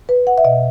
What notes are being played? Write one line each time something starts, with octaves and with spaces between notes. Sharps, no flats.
B4
F#5
E5
B2 D#5